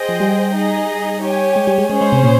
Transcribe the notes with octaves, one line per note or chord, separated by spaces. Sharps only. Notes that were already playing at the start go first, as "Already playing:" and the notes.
Already playing: G#4 C5 D#5 G5
F3
G3
D#4 G#4 D#5
G4 C#5 G#5
G#3
G3
G#3
G#3 C#4 G#4 C5
G#3
C3
A#2